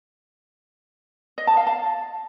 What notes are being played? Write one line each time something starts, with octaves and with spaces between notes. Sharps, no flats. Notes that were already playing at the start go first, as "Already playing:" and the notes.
D#5
A5
F5
A5